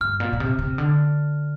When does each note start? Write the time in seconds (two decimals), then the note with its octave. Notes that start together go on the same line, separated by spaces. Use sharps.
0.01 G2 F6
0.20 A#2
0.33 A#2
0.40 C3
0.59 C3
0.78 D3